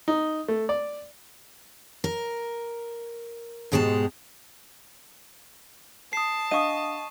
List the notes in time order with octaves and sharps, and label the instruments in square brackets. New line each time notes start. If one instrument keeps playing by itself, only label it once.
[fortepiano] D#4
A3
D5
[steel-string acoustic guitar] A#4
G#2 B2 G#3 G4 C5 A5
[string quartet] A5 [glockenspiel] D#6 C7
[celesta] D4 F5 D#6 [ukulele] D#5 F#5 [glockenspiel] C#6 D#7